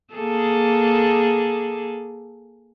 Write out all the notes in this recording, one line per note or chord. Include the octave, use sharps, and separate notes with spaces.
A#3 G#4 A4